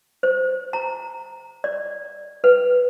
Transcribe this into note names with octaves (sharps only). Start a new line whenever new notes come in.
C5
A#5
D5
B4